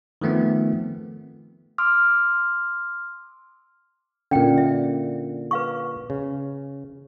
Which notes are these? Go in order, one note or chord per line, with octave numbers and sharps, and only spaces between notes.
D#3 F3 A3 B3 C4
C6 D6 E6 F6
A#2 D3 C#4 G5
E5
B4 F5 C#6
C#3